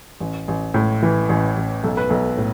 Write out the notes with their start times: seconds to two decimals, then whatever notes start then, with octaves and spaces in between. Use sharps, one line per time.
0.20 A1
0.48 A1
0.74 A2
1.03 E3
1.29 A1
1.57 A1
1.84 B1 A4
1.97 B4
2.09 B1 A4
2.37 A2